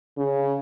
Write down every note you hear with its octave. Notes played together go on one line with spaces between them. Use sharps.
C#3